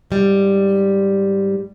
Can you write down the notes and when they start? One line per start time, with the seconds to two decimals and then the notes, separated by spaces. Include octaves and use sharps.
0.11 G#2 G3